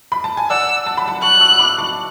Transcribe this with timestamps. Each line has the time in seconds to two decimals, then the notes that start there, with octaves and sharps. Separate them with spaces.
0.12 B5
0.24 A5
0.37 G#5
0.50 D5 F#5 E6
0.86 A5
0.97 B5
1.08 F#5 A5
1.23 A5 C#6 F#6
1.41 C#6 E6
1.52 E6
1.59 B5 D6
1.78 A5 C#6